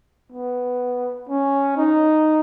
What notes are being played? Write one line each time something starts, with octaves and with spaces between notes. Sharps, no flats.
B3
C#4
D#4